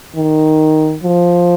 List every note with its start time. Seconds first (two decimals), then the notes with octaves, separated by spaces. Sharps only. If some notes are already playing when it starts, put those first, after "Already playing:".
0.16 D#3
1.03 F3